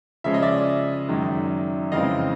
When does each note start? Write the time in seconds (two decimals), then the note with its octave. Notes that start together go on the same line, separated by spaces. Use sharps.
0.24 C#3 F3 G#3 C#4 E5
0.34 D#5
0.42 D5 E5
1.09 F#2 D#3 G#3
1.92 F2 C#3 E3 G#3 C4 D#5 F5